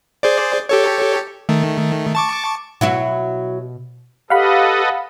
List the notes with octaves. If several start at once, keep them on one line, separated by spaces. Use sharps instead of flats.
G#4 C5 D5
G4 A4 C#5
D#3 A3
A5 C#6 D6
B2 F#3 E4 F#4
G4 A4 B4 D#5 F5 F#5 B5